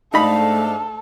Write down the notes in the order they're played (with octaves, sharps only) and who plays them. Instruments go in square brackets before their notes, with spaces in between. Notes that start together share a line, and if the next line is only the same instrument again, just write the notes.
[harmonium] G#2 D4 F5 [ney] A3 [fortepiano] D#4 B5 [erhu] A4